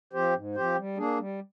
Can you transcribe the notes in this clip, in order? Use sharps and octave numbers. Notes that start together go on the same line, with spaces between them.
F3 C4 G4 C5
G#2
F3 C4 G4 C5
G3
A#3 D4 G#4
G3